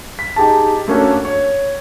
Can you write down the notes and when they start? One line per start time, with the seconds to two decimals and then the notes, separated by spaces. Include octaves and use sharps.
0.19 B6
0.36 D#4 G4 G#4 A5
0.88 A3 A#3 C#4 D4 F#4 A4
1.25 C#5